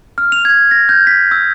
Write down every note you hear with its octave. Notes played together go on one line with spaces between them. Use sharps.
F6
F7
G#6
A#6
G6
B6
E6